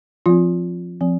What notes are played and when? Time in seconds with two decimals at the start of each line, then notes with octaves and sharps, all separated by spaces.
0.26 F3 C4 F4
1.01 F3 C4